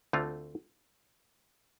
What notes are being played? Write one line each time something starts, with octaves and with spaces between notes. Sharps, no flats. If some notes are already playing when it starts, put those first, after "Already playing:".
D2 D3 A3 C4 F4